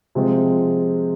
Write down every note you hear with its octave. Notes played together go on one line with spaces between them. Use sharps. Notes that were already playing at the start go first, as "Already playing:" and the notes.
C3 F3 G#3 C4 F4